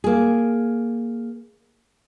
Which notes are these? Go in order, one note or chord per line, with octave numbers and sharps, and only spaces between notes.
A#3 G#4